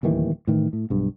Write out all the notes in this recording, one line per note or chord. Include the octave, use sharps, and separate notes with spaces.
D1 D#2 D#3 E3
A2 D#3 E3
A2
B1 G2